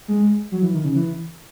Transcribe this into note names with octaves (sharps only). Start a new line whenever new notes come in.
G#3
F#3
E3
D#3
C#3
E3